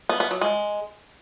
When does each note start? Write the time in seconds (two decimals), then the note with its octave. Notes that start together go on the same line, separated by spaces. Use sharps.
0.09 B3
0.20 B3
0.31 F#3
0.41 G#3